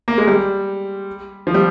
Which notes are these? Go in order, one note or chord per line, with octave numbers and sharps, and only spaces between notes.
A#3
G#3
G3
F3
G3